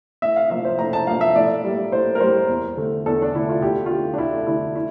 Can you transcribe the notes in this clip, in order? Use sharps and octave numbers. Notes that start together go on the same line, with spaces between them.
A2 E5
F5
F3 A#3 E5
C5
A2 A#5
A5
F3 A#3 F5
E5
A2 D5
G3 A#3
A2 C5
A#4
G3 A#3 C5
E2
D3 A3
E2 A4
D4
D3 A3 E4
F4
D2 G4
F4
D3 A3 G4
D4
D2 E4
D3 A3 E4
E4